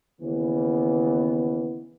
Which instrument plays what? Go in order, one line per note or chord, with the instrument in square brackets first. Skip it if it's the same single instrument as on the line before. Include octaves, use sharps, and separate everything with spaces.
[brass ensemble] D#2 C#3 E3 B3